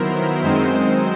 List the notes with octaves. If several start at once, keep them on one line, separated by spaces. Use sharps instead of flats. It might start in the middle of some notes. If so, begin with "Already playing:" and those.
Already playing: D#3 F#3 B3 E4 A#4 C5
F#2 D#3 G#3 C4 D#4 C5